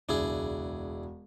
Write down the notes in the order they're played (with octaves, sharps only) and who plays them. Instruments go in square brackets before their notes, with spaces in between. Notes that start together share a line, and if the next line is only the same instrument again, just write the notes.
[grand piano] E1 [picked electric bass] C#2 F#2 [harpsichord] D4 E4 G#4